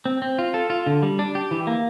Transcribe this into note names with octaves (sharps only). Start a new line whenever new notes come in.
C4
C4
F4
A4
F4
D3
G3
D4
G4
E3
A#3